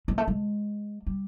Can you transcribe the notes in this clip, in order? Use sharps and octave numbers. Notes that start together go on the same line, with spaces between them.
G#3
A3
G#3
G3